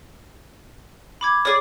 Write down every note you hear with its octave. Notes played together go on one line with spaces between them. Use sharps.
B5 D6 G#6
G#4 C#5 D5